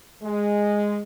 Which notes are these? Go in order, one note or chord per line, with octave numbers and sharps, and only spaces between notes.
G#3